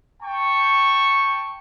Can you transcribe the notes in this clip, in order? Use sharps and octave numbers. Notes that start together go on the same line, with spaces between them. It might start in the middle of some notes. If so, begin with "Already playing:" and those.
G5 A5 C#6